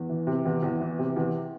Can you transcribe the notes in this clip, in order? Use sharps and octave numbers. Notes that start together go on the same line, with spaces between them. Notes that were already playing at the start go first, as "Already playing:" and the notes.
Already playing: E2
E3
C3
E2
E2
E3
C3
E2